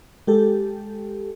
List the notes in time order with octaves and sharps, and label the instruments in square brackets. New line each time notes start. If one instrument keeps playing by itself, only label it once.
[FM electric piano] G#3 G4 A4